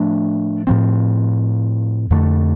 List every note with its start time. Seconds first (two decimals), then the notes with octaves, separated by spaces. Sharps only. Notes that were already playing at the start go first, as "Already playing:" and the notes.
Already playing: A2 F3 A3 D4
0.67 A2 F3 C4
2.10 F2 D3 A3